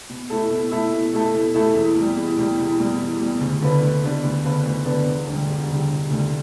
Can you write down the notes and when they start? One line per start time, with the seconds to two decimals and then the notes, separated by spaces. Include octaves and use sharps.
0.10 B2
0.30 A3 E4 A4
0.50 B2
0.71 A3 E4 A4
0.92 B2
1.13 A3 E4 A4
1.34 B2
1.55 A3 E4 A4
1.75 E2
1.96 B2 G3
2.17 E2
2.38 B2 G3
2.58 E2
2.79 B2 G3
2.99 E2
3.21 B2 G3
3.41 D2
3.62 D3 B3 D4 B4
3.82 D2
4.04 D3 B3 D4 B4
4.24 D2
4.44 D3 B3 D4 B4
4.65 D2
4.86 D3 B3 D4 B4
5.06 E1
5.27 D2 D3 G3
5.49 E1
5.70 D2 D3 G3
5.91 E1
6.10 D2 D3 G3